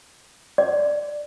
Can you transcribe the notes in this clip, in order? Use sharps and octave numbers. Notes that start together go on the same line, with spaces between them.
D5